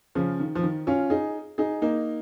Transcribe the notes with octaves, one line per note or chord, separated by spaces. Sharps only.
C#3 F3
D#3
F3
D#3
C#4 F4
D#4 G#4
D#4 G#4
A#3 D#4